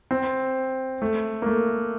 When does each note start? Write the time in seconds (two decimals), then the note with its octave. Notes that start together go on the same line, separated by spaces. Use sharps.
0.11 C4
1.02 A3
1.42 A#3
1.46 A3